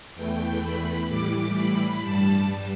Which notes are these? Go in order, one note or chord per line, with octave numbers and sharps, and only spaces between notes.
E2 E3 A3 G5
B5
A2 E3 G3 D6
B5
G2 G3 A5